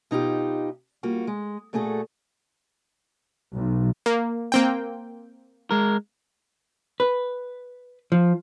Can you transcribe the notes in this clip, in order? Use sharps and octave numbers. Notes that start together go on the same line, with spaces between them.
B2 D#4 F4 G4
G3 A#3 F4 F#4
G#3
A#2 A3 F#4 G#4 A4
B1
A#3
A#3 C4 G5
G#3 A#4
B4
F3